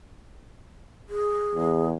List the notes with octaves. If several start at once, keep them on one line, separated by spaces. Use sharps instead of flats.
G#4
E2